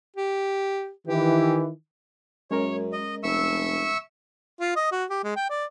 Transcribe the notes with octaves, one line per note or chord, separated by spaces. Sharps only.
G4
D#3 E3 G4
F#2 G#3 C#4 A#4 C#5
D#5
F1 E5 C#6 E6
F4
D#5
F#4
G4
G#3
G5
D5